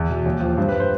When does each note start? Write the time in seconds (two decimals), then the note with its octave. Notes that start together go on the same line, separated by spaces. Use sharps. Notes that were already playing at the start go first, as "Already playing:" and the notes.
Already playing: E2
0.10 B2
0.26 D#2
0.41 F3
0.58 G2 C5
0.68 B4
0.80 C5